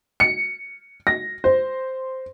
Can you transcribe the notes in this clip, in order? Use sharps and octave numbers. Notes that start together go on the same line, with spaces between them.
C#7
A#6
C5